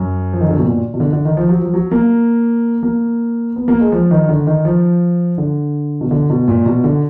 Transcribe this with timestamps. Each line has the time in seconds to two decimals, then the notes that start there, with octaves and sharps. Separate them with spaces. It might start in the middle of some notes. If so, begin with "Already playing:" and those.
Already playing: F#2
0.33 F3
0.41 D#3
0.49 D3
0.56 B2
0.64 A#2
0.94 B2
1.00 D3
1.13 D3
1.25 D#3
1.37 F3
1.49 F#3
1.61 F3
1.74 F#3
1.91 A#3
2.83 A#3
3.56 B3
3.68 A#3
3.80 G#3
3.92 F3
4.11 D#3
4.29 D3
4.47 D#3
4.65 F3
5.38 D3
6.01 B2
6.11 D3
6.30 B2
6.48 A#2
6.66 B2
6.84 D3